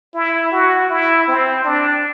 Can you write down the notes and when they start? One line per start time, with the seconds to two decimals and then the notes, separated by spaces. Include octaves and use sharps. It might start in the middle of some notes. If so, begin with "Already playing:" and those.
0.14 E4
0.52 F#4
0.90 E4
1.28 C4
1.64 D4